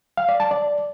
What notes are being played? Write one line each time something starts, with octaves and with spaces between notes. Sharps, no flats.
F5
D5
A5
D5